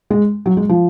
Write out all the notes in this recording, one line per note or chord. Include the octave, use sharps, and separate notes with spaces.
G#3
F#3
G#3
F3